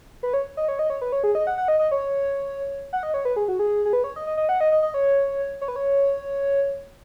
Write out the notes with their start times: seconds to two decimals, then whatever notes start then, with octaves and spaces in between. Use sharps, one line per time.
0.23 B4
0.34 C#5
0.57 D#5
0.68 C#5
0.79 D#5
0.90 C#5
1.02 B4
1.12 C#5
1.24 G#4
1.35 D#5
1.47 F#5
1.58 F#5
1.68 D#5
1.79 D#5
1.91 C#5
2.93 F#5
3.03 D#5
3.14 C#5
3.25 B4
3.36 G#4
3.48 F#4
3.59 G#4
3.86 G#4
3.93 B4
4.04 C#5
4.16 D#5
4.27 D#5
4.37 D#5
4.49 F#5
4.61 D#5
4.72 D#5
4.83 D#5
4.94 C#5
5.61 C#5
5.68 B4
5.76 C#5